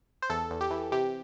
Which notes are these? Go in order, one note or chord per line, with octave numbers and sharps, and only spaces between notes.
C5
E2 A4
E2
G4
E3
C3 G4